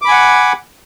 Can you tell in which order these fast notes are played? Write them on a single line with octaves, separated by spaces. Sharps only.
D6 B5 G#5 F#5